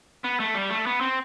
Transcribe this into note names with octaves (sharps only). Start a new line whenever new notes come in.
B3
A3
G3
A3
B3
C4